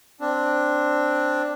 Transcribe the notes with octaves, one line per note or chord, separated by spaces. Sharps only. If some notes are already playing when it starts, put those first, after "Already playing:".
C4 D4